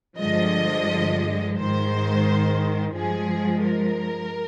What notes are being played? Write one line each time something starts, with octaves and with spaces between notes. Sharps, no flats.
G2 D3 F3 G#3 D#5
G#2 D#3 G#3 C5
G2 F3 G#3 G#4
A#4